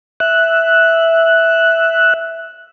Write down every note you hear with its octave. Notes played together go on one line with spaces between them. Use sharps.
E5 F#6